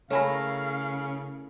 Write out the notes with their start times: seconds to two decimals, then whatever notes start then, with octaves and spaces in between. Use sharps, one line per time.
0.11 C#3 A3 E4 A#4 C#5 F5 G#5 B5